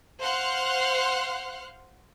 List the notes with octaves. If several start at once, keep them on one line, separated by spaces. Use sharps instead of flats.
C5 F5 F#5 C6 F6 F#6